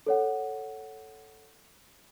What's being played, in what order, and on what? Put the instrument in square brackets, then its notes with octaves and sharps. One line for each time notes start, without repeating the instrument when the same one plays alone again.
[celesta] A4 C#5 F#5